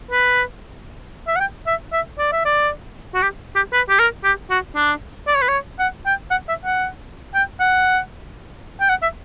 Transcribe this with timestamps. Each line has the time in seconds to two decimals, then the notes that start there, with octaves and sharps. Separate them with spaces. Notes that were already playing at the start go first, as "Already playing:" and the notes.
0.11 B4
1.28 E5
1.36 F#5
1.40 G5
1.67 E5
1.92 E5
2.19 D5
2.32 E5
2.45 D5
3.14 F#4
3.22 G4
3.56 G4
3.73 B4
3.90 G4
3.99 A#4
4.24 G4
4.50 F#4
4.76 D4
5.27 D5
5.35 C#5
5.42 B4
5.48 C#5
5.79 F#5
6.06 G5
6.31 F#5
6.49 E5
6.65 F#5
7.35 G5
7.60 F#5
8.81 G5
8.89 F#5
9.02 E5